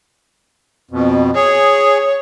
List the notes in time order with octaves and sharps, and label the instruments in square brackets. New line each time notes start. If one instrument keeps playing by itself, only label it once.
[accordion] F2 B2
[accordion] G#4 [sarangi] C#5